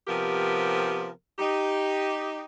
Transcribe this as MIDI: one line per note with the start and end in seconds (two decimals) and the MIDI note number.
0.08 1.08 48
0.08 1.08 53
0.08 1.08 59
0.08 1.08 67
0.08 1.08 70
1.39 2.44 63
1.39 2.44 67